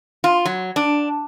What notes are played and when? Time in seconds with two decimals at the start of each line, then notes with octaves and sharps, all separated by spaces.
0.24 F4
0.46 F#3
0.76 D4